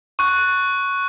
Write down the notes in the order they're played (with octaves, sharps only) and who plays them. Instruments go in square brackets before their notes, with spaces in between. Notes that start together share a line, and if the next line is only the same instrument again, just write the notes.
[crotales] C#6 F#6